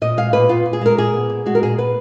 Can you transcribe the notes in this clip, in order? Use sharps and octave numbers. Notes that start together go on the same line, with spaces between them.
A#2 D#5
G#3 F5
A#2 B4
B3 F4
A#2
G#4
G#3 A#4
A#2 G#4
B3
A#2
G#3 F#4
A#4
A#2 G#4
B3 B4